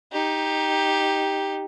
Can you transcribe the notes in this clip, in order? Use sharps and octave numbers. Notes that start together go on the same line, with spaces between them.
D#4 G4